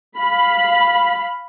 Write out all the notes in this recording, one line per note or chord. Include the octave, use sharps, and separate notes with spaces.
F5 B5